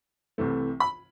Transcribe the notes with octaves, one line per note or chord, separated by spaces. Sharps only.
C2 C3 E3 A3
B5